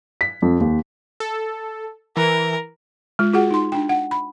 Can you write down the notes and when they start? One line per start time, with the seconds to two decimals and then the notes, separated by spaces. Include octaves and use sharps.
0.21 B6
0.42 F2
0.60 D#2
1.20 A4
2.17 E3 A#4
3.19 G#3 F4
3.33 F4 F#4 G#4 F#5
3.51 D#4 C6
3.72 D4 G5
3.89 F#5
4.11 B5